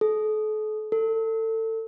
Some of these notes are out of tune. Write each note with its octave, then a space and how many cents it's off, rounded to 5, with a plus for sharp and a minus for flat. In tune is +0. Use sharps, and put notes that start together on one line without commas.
A4 -40
A4 +25